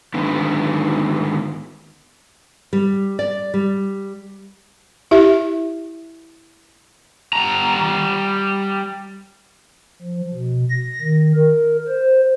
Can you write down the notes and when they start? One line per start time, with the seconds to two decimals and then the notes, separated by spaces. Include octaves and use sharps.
0.14 G#2 D3 D#3 B3
2.73 G3
3.19 D5
3.54 G3
5.11 E4 G4 E5
7.33 G3 A#5
10.02 F3
10.34 B2
10.70 A#6
11.02 D#3
11.35 A#4
11.88 C5